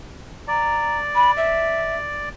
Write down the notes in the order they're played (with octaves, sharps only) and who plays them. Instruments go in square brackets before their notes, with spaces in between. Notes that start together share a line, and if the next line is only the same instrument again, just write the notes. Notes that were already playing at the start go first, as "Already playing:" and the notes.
[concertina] D5 [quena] A#5
[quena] B5
E5